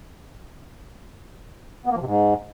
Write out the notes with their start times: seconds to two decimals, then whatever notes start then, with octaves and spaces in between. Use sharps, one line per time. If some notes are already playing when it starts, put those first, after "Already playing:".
1.86 B3
1.91 A#3
1.96 F3
2.01 C3
2.06 G#2